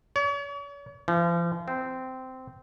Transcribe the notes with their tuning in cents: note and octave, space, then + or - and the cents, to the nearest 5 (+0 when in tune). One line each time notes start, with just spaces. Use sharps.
C#5 +40
F3 -40
C4 -15